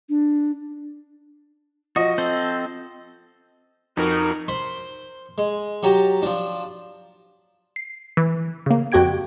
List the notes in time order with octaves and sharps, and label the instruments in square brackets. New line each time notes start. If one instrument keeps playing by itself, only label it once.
[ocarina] D4
[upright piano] F3 D#5 [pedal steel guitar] F#4
[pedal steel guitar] C4 A4 C5
[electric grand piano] F2 [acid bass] D#4 [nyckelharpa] F#4 A#4
[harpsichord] C5 B5 C6
G#3
F#3 G4 A5 A#5
F3 D4
[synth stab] C7
E3
C#3 A#3
F2 F#4 G4 G5 G#6 D7